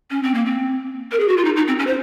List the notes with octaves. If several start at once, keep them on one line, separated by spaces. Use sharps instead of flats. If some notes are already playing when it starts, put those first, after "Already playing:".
C#4
C4
A#3
C4
A#4
G#4
F#4
F4
D#4
D#4
C4
C#4
C5